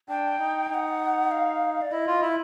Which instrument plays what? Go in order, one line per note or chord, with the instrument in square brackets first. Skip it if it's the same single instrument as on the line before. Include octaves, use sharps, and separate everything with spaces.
[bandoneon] D4 [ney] G5
[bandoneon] D#4
[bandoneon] D#4 [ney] F#5 G5
[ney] F5
D5
[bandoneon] E4 [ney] D#5
[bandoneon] F4
E4